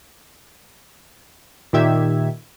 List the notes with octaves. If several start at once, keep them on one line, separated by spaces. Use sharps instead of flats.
A#2 D#3 G4 E5 G#6